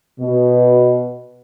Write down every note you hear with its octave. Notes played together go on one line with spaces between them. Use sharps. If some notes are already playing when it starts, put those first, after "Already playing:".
B2